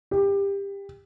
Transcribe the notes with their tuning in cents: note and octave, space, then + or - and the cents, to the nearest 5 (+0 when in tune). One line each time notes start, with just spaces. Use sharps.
G4 +20